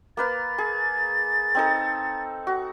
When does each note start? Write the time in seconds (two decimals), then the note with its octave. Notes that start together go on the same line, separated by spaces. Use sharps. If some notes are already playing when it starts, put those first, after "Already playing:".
0.17 A#3 B4 F5 A6
0.58 G#4
1.55 C4 D#4 A4
2.47 F#4